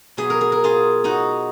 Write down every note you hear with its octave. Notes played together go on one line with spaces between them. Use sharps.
B2 F#3 G#4
A#4
G#4
A#4
F4 G#4
D#4 F#4